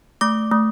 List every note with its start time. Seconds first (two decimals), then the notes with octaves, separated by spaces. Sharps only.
0.21 A3 D6
0.51 A3